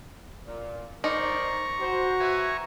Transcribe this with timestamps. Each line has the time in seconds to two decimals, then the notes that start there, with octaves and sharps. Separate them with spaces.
0.46 A#2
1.04 D#4 A#4 C5 D5 A#5 C#6
1.81 F#4 C5
2.20 B4 E5 G#5